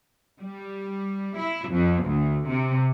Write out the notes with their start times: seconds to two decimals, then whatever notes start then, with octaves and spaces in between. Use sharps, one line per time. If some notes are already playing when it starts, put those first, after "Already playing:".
0.40 G3
1.36 E4
1.69 F2
2.04 D2
2.48 C3